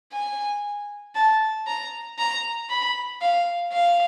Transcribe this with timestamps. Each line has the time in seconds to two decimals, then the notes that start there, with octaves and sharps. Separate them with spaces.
0.13 G#5
1.15 A5
1.67 A#5
2.18 A#5
2.70 B5
3.21 F5
3.73 F5